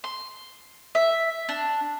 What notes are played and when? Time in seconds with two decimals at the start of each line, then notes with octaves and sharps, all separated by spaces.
0.04 C6
0.95 E5
1.49 D4